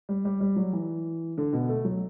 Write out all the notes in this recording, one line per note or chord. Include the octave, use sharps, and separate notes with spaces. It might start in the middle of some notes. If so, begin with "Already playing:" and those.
G3
G3
G3
F#3
E3
D3
B2
A3
F#3